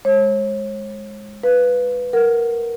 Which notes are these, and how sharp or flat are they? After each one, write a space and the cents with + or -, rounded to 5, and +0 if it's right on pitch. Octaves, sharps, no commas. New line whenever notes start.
G#3 +0 C#5 -40
B4 +0 F5 +0
A#4 +0 F#5 +0